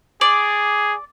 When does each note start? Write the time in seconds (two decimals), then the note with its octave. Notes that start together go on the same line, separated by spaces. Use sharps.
0.21 G#4 D5